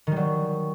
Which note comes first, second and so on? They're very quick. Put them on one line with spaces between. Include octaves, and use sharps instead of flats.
D#3 G3 F#3